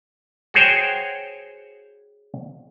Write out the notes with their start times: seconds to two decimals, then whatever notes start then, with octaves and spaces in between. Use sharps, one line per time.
0.54 F#4 G#4 C5 C#5 G5